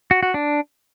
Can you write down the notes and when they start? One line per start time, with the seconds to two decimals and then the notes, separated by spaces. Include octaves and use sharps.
0.11 F#4
0.23 F#4
0.34 D4